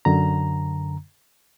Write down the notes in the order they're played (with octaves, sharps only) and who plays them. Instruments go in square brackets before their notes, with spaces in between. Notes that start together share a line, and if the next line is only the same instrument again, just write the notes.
[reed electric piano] F#2 D3 A#5